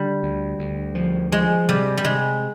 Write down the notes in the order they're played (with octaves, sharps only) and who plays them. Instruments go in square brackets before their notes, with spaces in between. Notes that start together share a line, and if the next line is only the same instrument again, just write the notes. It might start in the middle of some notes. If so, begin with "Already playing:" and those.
Already playing: [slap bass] D3 [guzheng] G3
[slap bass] D2
D2
F3
[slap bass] F3 [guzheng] G#3
[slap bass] C3 [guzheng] G3
[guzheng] G3
[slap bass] C3 [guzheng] G#3